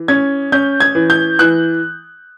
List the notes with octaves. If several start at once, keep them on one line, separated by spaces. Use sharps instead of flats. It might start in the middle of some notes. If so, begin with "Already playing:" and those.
Already playing: E3
C#4 G#6
C#4 G6
G#6
E3
G6
E3 F#6